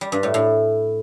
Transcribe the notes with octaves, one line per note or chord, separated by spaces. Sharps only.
G3
G2
A2
A2